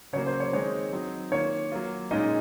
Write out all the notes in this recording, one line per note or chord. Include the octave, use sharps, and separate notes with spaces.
C#3 F#3 A#3 C#5
C5
C#5
D#3 G#3 C4 D#4 C#5
F#3 C4 D#4
D#3 A#3 F4 C#5
F#3 A#3 F4
A#2 G#3 C#4 D#4 F4 D#5